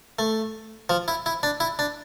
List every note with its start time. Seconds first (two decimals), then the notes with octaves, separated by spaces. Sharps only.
0.19 A3
0.89 F3
1.08 E4
1.26 E4
1.43 D4
1.60 E4
1.79 D4